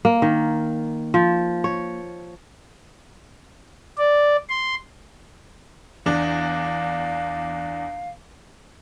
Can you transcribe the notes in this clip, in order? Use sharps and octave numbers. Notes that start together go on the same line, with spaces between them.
A#3
D#3
F3
C#5
D5
C6
E2 D4 F5